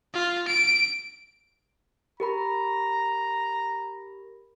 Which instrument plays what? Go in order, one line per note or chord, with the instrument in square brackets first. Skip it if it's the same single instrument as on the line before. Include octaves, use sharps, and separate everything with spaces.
[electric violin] F4
D7
[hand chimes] G4 A#4 B5 [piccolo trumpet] A#5